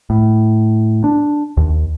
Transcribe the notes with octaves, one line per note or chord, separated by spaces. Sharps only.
A2
D4
D#2